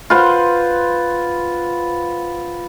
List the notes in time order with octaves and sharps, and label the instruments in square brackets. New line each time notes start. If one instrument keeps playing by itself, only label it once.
[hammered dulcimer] F4 B4 C5 F#5